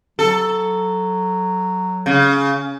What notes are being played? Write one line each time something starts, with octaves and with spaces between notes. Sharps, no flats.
F#3 A4
C#3